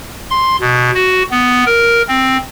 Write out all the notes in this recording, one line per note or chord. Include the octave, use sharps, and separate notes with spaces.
C6
B2
F#4
B3
A#4
C4